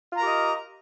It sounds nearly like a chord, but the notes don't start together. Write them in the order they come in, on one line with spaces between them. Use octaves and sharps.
F4 A#5 A#4 G4 D#5